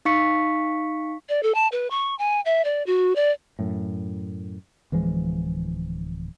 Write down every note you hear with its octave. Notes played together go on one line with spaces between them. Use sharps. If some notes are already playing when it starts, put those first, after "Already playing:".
D#4 F5 C#6 B6 C#7
D5
A4
A5
B4
C#6
G#5
E5
D5
F#4
D5
F#2 A2
D1 E3 F3 G#3